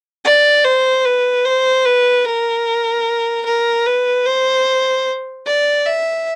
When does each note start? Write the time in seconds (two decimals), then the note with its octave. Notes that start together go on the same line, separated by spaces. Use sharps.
0.25 D5
0.64 C5
1.05 B4
1.45 C5
1.85 B4
2.25 A#4
3.46 A#4
3.86 B4
4.26 C5
5.47 D5
5.86 E5